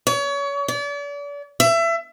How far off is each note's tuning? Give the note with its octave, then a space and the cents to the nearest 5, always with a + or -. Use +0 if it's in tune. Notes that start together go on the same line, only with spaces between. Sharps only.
C#5 +30
D5 -40
E5 +25